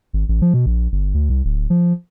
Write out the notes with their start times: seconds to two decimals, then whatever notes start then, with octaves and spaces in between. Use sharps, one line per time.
0.13 G#1
0.29 A1
0.42 F3
0.54 B2
0.66 A#1
0.92 G1
1.14 D2
1.30 C2
1.45 D1
1.70 F3